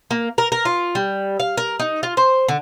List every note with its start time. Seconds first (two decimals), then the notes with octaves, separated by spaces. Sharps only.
0.11 A#3
0.38 A#4
0.52 A#4
0.65 F4
0.95 G3
1.40 F5
1.57 A#4
1.80 D#4
2.03 F4
2.17 C5
2.48 D3